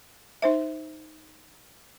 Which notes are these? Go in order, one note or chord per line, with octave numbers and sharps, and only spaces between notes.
D#4 C5 E5